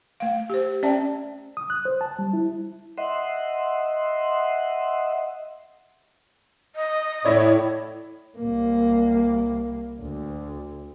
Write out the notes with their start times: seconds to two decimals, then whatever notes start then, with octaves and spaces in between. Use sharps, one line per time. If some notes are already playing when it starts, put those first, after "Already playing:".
0.20 A3 F5
0.50 G4 C5
0.83 C#4 D5 E5 G5 A5
1.57 D#6
1.70 F#6
1.85 C5
2.01 A5
2.19 G3
2.33 E4
2.98 D#5 E5 F#5 C6
6.76 D#5
7.25 A2 E4 C#5 D5
8.38 C2 A#3
10.01 D2